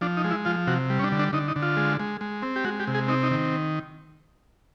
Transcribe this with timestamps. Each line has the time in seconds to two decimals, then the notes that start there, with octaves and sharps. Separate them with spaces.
0.01 F3 D4
0.17 D#4
0.24 G#3
0.31 E4
0.45 F3 F4
0.67 C3 F#4
0.90 G3
0.99 C#4
1.04 D4
1.12 D3
1.19 D4
1.33 D3 D#4
1.48 D#4
1.56 D3
1.62 F4
1.77 G#3
2.00 G#3
2.21 G#3
2.42 C4
2.56 G4
2.64 G#3 F#4
2.80 G4
2.87 C3
2.94 G#4
3.08 C4 D#4
3.23 D#4
3.31 D#3